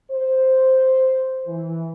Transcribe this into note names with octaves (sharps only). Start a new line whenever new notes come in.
C5
E3